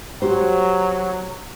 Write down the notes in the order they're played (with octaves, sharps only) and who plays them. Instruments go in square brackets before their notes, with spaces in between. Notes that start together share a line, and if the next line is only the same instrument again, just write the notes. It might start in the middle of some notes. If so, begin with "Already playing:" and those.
[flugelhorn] F#3 [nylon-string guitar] F#4 G4 C5